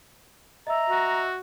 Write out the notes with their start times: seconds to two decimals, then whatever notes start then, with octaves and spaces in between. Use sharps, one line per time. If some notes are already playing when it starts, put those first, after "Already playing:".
0.67 D#5 E5 A#5 E6
0.90 F#4